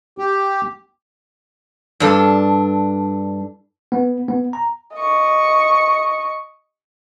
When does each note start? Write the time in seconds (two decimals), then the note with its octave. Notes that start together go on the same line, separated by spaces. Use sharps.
0.18 G4
2.00 G2 D4 A4
3.92 B3
4.28 B3
4.53 A#5
4.95 D#5 C#6